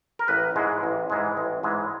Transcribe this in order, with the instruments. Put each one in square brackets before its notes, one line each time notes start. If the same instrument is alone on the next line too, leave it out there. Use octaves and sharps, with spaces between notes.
[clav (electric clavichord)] A#4
A1 B4
G#2 E3 G#3
A1
G#2 E3 G#3
A1
G#2 E3 G#3